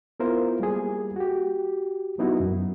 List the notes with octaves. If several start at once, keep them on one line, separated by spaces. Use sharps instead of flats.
B3 E4 F4 A#4 C5
G3 A#3 G#4
F#4 G4
F#3 B3 D#4 E4 F#4
F#2